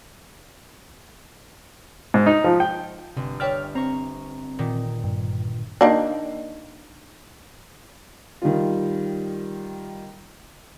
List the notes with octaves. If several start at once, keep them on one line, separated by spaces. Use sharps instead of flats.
G#2
D#4
F3
G5
G1 C3
C#5 D5 E5 G5 F6
C4 A#5 C#6
A#2 D#3
G2
D#3 A#3 D4
D#3 G3 F4